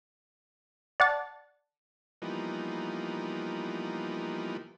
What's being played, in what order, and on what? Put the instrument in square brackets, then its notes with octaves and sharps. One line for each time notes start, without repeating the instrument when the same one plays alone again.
[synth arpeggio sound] D5 F#5 A5
[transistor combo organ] E3 F3 G3 A#3 B3 D#4